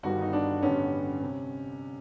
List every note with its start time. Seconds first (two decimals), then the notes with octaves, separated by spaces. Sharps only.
0.03 G1 G2 D#3 G3 B3 F#4
0.21 D#4
0.33 D4
0.62 A1 G2 D3 G3 B3 C#4
1.22 C3